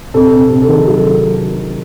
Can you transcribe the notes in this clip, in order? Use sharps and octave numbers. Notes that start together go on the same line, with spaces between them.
C3 A4
C3
C3
A4
D#3 G#4
F#3
A4